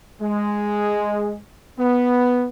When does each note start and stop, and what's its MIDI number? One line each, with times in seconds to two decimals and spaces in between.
0.21 1.36 56
1.78 2.46 59